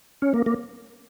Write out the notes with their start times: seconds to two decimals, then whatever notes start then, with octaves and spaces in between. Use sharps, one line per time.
0.22 C#4
0.34 A#3
0.46 A#3